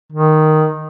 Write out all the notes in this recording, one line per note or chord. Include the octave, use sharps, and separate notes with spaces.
D#3